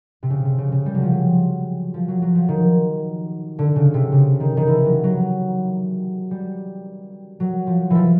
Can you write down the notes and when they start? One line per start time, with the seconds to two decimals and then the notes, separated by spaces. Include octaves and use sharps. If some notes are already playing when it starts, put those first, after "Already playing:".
0.23 C3
0.30 C#3
0.45 C3
0.58 C#3
0.72 C#3
0.86 G3
0.94 F#3
1.02 F3
1.12 F#3
1.94 F3
2.08 F#3
2.22 F#3
2.35 F3
2.48 D#3
3.59 D3
3.76 C#3
3.94 C3
4.12 C#3
4.40 D#3
4.57 D#3
4.67 E3
4.85 F#3
5.04 F#3
6.31 G3
7.40 F#3
7.67 F3
7.90 E3 F3